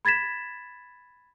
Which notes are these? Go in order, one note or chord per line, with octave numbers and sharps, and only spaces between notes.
B5 G#6 A6 B6 E7